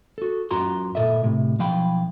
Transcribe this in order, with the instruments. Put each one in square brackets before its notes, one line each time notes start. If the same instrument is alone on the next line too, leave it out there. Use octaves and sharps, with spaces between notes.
[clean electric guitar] F#4 A4
F#2 F4 F#4 A#5 C6
A#2 A4 D#5 E5
A2 C3
B1 F3 F5 G5 B5